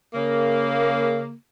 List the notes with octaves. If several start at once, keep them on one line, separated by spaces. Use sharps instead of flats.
C#3 A#3